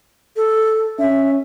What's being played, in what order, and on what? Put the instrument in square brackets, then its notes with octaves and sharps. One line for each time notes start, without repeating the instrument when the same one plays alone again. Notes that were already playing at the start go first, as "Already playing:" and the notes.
[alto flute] A4
[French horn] C#4 [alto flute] E5